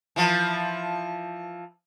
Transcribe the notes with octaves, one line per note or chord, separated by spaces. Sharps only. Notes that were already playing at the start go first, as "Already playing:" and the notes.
E3 F3